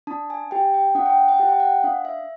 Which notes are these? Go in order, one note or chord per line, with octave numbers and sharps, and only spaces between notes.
D4 A5
G#5
G4 G5
G5
D4 F#5
G5
F#5
G5
G4 F#5
G5
F#5
D4 F5
E5